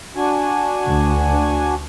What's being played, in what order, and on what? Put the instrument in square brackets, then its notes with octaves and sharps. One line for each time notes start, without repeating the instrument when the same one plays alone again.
[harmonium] D4 F#4 G#5
[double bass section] D2